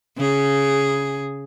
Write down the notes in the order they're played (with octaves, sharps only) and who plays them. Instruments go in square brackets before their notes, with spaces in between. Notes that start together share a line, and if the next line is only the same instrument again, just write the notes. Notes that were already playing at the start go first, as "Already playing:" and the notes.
[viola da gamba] C#3 G#4